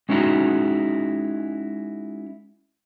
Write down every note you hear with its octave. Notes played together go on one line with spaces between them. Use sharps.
G#3 C#4 D#4 E4 F#4 G#4